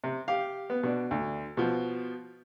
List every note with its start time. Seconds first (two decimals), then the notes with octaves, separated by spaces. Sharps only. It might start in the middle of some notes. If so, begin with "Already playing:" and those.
0.04 C3
0.28 G4 F5
0.70 B3
0.83 B2 D4
1.11 D2
1.57 B2 F3